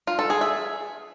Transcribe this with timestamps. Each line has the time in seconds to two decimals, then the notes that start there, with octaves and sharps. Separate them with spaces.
0.07 F4
0.19 A4
0.30 G#4
0.41 E5